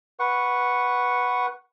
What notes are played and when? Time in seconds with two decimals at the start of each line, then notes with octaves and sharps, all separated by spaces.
0.19 B4 F#5 C#6